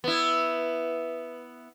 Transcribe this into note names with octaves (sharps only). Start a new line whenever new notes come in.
B3 E4